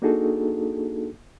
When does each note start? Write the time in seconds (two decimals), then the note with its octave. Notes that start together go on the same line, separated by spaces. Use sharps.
0.02 A#3 D4 D#4 F#4 G#4 A4